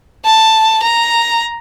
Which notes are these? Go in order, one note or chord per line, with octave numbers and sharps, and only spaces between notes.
A5
A#5